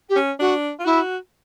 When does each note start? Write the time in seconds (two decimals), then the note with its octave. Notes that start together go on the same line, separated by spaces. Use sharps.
0.09 G4
0.16 C#4
0.39 D4 F#4
0.79 F4
0.85 E4 F#4